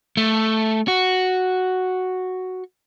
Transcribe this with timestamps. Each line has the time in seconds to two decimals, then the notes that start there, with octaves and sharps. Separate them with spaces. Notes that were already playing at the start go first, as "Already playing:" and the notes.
0.17 A3
0.88 F#4